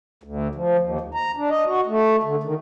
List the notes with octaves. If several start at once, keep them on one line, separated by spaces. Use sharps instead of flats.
D2
F3
D#2
D2
A#5
D4
D#5
F#4
A3
D3
D#3